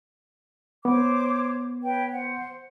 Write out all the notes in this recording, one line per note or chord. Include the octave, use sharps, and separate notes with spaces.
B3 C5 C#5 D6
B4 C#5 G5
C5 F#5